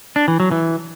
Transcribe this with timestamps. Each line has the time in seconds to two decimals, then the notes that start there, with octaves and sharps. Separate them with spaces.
0.16 D4
0.28 E3
0.40 F#3
0.51 E3